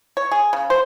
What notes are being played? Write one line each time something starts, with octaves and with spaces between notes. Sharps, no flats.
C#5
G#4
C#3
C5